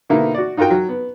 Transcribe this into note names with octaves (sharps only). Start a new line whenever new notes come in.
B2 D3 A#3 D#4 E4
F#4 D5
D#4 F4 F#4 A#4 G5
F#3
B3